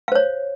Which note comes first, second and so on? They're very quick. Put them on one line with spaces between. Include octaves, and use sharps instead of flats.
F5 C5 C#5